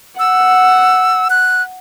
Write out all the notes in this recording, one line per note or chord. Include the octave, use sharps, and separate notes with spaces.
F#5 E6
F#6